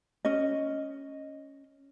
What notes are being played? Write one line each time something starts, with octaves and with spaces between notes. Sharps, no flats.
C#4 D#5